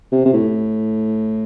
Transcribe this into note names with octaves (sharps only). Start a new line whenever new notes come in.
C3
C3
A2